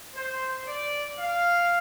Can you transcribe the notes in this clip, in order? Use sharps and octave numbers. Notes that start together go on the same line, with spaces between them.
C5
D5
F5